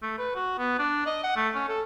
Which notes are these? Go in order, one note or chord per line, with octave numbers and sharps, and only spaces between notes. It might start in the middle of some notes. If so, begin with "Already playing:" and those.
A3
B4
F#4
B3
D4
D#5
F#5
A3
C#4
A4